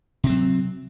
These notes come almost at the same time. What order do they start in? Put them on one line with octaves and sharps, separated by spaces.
C3 C4 F#3